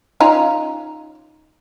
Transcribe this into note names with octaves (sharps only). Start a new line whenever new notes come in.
C#4 D#4 F4